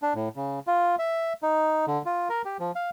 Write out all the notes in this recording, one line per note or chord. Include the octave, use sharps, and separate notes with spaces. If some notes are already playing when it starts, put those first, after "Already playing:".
D4
A2
C#3
F4
E5
D#4
D3
F4
A#4
G4
F3
F5